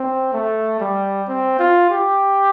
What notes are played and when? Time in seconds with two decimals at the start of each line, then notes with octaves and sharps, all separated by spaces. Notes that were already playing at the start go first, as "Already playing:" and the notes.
Already playing: C4
0.33 A3
0.80 G3
1.28 C4
1.59 F4
1.90 G4